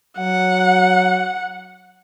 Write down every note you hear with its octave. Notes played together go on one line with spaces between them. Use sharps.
F#3 F#5